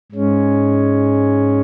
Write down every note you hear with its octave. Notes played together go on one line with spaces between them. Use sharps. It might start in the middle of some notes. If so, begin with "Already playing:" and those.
G#2 G#3 C#4